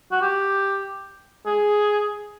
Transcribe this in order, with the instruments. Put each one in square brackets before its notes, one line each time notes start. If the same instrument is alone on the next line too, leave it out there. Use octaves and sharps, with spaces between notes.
[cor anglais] F#4
G4
G#4